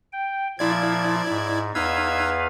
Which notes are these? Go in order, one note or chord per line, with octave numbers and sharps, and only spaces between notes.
G5
A#2 F3 E4 D5 G#6
G#2
E2 D#4 B4 F5 E6 G#6